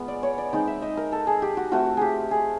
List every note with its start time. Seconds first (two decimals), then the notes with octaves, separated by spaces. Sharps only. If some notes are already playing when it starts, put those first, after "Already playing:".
Already playing: G#3 B3 F4
0.08 D5
0.23 C#5
0.38 D5
0.53 G#3 C4 D#4
0.67 E5
0.82 D#5
0.97 A#4
1.12 A4
1.27 G#4
1.42 G4
1.57 F#4
1.71 A3 C4 F4 F#4
1.97 G4 G#4
2.31 G#4